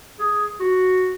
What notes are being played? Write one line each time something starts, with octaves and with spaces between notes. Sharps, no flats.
G#4
F#4